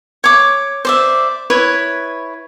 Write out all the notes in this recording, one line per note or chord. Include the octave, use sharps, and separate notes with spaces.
C#5 D6
C5 D5 E5
E4 B4 C#5